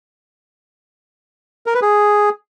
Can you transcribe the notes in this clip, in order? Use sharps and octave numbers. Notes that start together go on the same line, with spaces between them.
A#4
B4
G#4